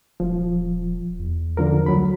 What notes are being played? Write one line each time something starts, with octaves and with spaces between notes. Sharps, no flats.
D#1 F3
E2
D3 F3 A#4
D2 F#3 B5